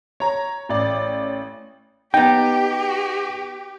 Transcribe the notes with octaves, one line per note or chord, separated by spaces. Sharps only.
C#5 A#5
A1 D5
B3 D#4 G4 G5